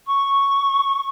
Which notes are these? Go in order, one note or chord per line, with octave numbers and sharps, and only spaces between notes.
C#6